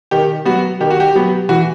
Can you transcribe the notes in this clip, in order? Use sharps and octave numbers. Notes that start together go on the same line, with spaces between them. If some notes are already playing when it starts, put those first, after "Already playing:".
D#3 G4
F#3 B3 F#4
D#3 G4
F#4
G4
F#3 B3
E3 F#4